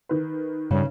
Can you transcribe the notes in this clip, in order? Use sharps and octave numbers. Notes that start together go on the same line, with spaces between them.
D#3 B4
G2 C#3